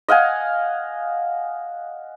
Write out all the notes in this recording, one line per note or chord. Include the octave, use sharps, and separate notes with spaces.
D#5 F5 F#5 G#5